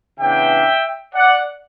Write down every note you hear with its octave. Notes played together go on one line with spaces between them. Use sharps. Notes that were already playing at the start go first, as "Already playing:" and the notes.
C#3 E3 B3 D4 E5 G5
D5 F#5